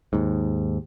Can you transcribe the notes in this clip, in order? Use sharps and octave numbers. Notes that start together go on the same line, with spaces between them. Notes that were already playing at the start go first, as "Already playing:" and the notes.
D#2 G#2